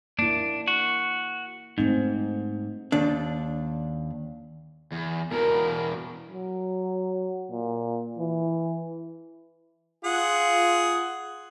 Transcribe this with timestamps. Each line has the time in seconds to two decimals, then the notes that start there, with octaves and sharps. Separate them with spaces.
0.19 A#3 D4 E4
0.68 F#4
1.78 G#2 A3 C4 D#4
2.92 D#2 D4
4.92 E2
5.32 E2 B2 A#4
6.30 F#3
7.51 A#2
8.18 E3
10.05 F4 G#4 F#5